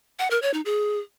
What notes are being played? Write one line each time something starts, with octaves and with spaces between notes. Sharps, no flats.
F#5
A#4
C#5
D#4
G#4